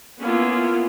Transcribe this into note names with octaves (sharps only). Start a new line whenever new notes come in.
A#3 B3 C#4 E4 F4